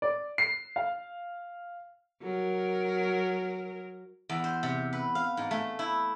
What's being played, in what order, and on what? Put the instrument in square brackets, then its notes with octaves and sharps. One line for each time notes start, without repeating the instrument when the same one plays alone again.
[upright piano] D5
C7
F5
[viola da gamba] F#3 A#4
[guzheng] E2
C5
C3
B4
F5
G#2
A3
E4